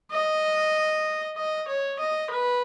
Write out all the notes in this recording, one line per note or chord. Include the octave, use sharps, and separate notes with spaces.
D#5
D#5
C#5
D#5
B4